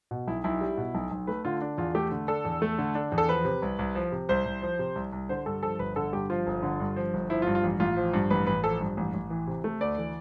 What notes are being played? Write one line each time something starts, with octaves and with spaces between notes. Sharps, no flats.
B2
B1 E4
B1 E4
G3
B2
B1
B1
A3 B4
D3 F4
D4
E2 F4
A3 G4
D3
D4 A4
E2
A3
D3
D4
E2
A4
F3 B4
C3
C2
C2
F3
C3
C2 C5
C2
F3
C3
C2
C2
D3 C5
G2 A4
F3 A4
G1 B4
D3 A4
G2 G4
F3 F4
G1
D3
G2
F3
G1
F3 E4
F4
G2
F4
A1
A1 F4
F3
G2
A1 B4
A1 B4
F3 A4
G2
A1
A1
E3
C3
A3
D2 D5
E3